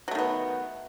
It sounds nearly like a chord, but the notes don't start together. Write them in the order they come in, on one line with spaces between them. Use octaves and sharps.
F#3 A3 D#3 B3